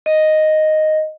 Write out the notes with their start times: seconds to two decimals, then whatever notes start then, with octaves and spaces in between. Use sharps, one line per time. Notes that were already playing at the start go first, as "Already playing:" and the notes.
0.06 D#5